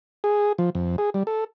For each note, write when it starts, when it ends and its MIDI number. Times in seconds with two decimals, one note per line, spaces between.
0.24 0.53 68
0.58 0.70 53
0.75 0.96 41
0.98 1.10 68
1.14 1.23 55
1.27 1.44 69